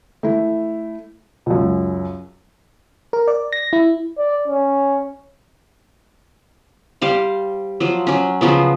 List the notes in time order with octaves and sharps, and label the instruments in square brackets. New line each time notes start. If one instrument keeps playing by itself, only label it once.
[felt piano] A3 E4
C#2 F#2
[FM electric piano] A#4
D5
A#6
E4
[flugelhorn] D5
C#4
[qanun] G3 C5 F5
F3 F#3
F#3 C#4
C#3 F3 F#3 B3